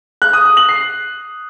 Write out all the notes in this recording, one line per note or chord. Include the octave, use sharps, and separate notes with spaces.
F#6
D#6
D#6
F#7
C7